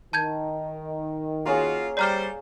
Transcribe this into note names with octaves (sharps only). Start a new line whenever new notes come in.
D#3 A5 G6 G#6
A#3 C#4 F4 F#4 G#4
G3 C5 D5 A#5 F6